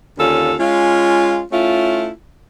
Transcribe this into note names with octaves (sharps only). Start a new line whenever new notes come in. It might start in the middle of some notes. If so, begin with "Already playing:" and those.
D#2 D3 C#4 F4 A4
G#3 C#4 F4
A3 C#4 E4 F4